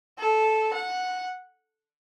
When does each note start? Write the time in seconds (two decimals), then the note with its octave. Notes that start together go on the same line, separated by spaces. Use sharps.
0.18 A4
0.73 F#5